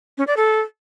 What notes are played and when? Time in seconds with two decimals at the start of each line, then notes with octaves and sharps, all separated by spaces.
0.18 C#4
0.27 D5
0.37 A4